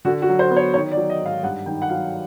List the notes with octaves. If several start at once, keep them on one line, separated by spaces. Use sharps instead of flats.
D3 F#4
F#4
F#3
C5
B3
C#5
D#3 C#5
D5
F#3
D#5
G#2 F5
G2 F#5
D#3 G5
F#5
F#3 F5